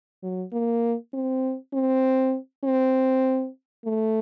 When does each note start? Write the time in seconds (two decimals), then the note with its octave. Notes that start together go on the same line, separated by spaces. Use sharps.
0.23 F#3
0.53 A#3
1.14 C4
1.74 C4
2.64 C4
3.85 A3